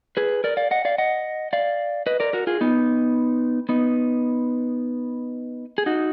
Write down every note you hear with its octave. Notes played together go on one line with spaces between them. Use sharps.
G#4 B4
A#4 D5
D5 F5
D#5 F#5
D5 F5
D#5 F#5
D5 F5
B4 D#5
A#4 D5
F#4 A#4
F4 G#4
B3 D#4
B3 D#4
G#4
D#4 F#4